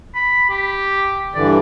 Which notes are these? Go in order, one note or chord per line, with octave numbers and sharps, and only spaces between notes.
B5
G4
G2 D3 E3 D5